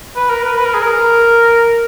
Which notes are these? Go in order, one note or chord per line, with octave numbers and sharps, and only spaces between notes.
B4
A#4
B4
B4
A#4
G#4
A#4